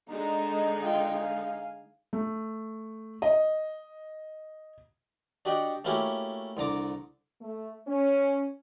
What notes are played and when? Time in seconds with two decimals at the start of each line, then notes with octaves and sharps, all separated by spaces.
0.11 D3 G#3 D#4 A#5
0.82 F4 G5
1.18 F5 G#5
2.13 A3
3.22 D#5
5.45 D4 F#4 G4 D#5 F#5 G5
5.85 A3 A#3 C#4 E4 F#4 G4
6.57 C2 D3 A#5 D6
7.42 A3
7.87 C#4